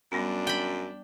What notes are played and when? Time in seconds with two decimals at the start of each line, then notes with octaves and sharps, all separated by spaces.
0.12 F#2 G3 B3 D4
0.47 G5 B5